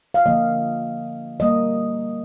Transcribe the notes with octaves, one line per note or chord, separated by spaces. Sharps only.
F5
D3 F3 A#3 D#5
D3 G3 A#3 D#5